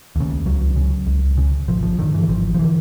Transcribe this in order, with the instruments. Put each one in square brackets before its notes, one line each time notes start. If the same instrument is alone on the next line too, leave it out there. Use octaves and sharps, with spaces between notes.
[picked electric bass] D#2 C#3
C#2 F#3
C#3
C#2
C#3
G#1 F3
F3
G2 D3 D#3
E3
G#1 F3
F3
D3 E3